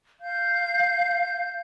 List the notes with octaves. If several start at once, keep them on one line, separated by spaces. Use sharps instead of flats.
F5 G6